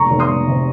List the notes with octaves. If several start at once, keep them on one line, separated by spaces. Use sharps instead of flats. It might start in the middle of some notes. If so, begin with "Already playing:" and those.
Already playing: F1 A#5 C#6
F1
C6 D#6
F1
C3